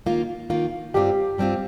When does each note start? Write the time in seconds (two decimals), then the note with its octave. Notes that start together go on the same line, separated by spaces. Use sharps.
0.06 D#3 A#3 F4
0.50 D#3 A#3 F4
0.94 G2 G3 C4 F4 G4
1.38 G2 G3 C4 F4